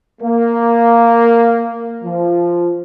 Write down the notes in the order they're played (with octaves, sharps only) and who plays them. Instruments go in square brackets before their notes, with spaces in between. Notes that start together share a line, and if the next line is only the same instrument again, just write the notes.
[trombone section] A#3
F3